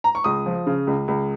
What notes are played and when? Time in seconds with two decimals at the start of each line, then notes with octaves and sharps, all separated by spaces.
0.04 A#5
0.15 C#6
0.24 C#2 D#6
0.46 F3
0.67 C#3
0.87 C#2
1.08 C#2